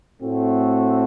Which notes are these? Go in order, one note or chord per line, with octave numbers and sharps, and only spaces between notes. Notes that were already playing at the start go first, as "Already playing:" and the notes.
A2 A3 C4 F#4